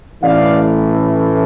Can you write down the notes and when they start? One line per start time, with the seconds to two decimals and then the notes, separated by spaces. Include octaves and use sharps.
0.23 A1 A2 E3 D5 F5